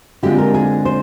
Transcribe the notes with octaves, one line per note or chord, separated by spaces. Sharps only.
D3 G#3 C4 F4 G4
A#4
G#4
C5